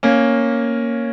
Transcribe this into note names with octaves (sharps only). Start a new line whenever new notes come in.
A#3 C#4